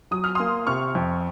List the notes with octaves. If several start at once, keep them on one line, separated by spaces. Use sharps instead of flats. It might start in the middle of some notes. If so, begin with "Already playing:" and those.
F#3 D#6
F6
A#3 C6 D#6
C3 C#6 F6
F2